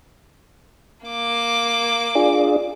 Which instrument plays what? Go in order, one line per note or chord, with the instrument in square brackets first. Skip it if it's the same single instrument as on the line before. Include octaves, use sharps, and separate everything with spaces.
[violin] A#3 D6
[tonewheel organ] D4 F4 G#4